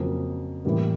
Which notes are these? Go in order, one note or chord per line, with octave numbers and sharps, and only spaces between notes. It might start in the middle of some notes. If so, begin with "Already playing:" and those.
Already playing: F2 C#3 F#3 A#3
A2 E3 G3 A#3